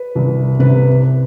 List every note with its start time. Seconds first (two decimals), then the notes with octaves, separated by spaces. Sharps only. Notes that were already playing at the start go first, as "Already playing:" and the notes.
Already playing: B4
0.15 C2
0.59 C3 B4